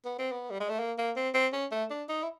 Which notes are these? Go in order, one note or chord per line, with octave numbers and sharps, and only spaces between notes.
B3
C4
B3
G3
G#3
A3
A#3
A#3
C4
C4
C#4
A3
D4
D#4
E4